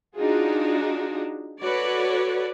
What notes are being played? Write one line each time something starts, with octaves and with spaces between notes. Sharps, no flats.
D4 D#4 F4 F#4 G#4
F#4 A4 B4 C#5 D5